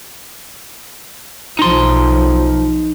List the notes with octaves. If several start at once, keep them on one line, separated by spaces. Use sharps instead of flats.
B1 F3 D#4 C6